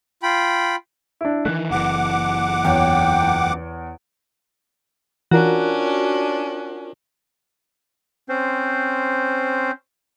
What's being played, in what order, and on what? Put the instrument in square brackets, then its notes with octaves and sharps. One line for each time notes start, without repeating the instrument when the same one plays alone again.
[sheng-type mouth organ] F4 G5 B5
[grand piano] D4 E4
[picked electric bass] D#3 E3 A3 [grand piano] F#6
[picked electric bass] F#1 E3 [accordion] F#5 D6
[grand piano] E2 C#5 [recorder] G5
[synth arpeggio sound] E3 [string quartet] C#4 D4 [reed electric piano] F4 A#4 [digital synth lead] F#4
[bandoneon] C4 C#4 C5